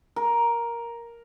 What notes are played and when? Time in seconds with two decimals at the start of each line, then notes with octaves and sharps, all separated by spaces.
0.16 A#4